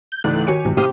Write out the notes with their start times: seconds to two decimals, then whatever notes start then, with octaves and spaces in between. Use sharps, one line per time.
0.12 G6
0.24 C#2 G#2 E3 A3 D5 F#6
0.47 D#3 F#4 G4 C#5 G#5 C#7
0.65 G#2 C3 E3 G3
0.77 C4 G4 F5 C6 D#6